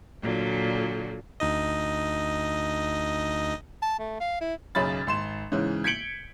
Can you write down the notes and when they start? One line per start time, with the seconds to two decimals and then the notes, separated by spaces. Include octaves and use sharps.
0.22 A#2 D3 F#3
1.40 D2 D#4 D#5
3.82 A5
3.99 A3
4.21 F5
4.40 E4
4.75 B1 F#2 C#3 B5 A6
5.07 G#1 C6 E7
5.52 G#2 C#3 E3
5.84 G#6 B6 C#7 D7 F#7 G7